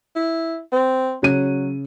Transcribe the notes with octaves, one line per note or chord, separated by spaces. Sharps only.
E4
C4
C#3 F#3 D#7